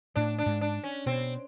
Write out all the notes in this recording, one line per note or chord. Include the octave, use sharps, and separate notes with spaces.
A2 D4
D4
G#2
D4
C#4
B2 C4